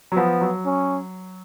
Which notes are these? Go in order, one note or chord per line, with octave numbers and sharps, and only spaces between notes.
F#3
F3 B3
F#3
C#4